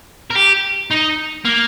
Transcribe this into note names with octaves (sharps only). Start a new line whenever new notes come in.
A#4
G4
D#4
A#3